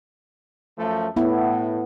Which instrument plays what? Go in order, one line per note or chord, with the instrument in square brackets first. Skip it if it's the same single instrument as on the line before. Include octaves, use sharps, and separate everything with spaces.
[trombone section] F#2 F3 A3
[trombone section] A2 [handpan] B3 E4